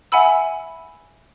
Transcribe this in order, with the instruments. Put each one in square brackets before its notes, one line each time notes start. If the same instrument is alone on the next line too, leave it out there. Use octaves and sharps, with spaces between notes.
[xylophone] E5 F#5 G#5 B5 E6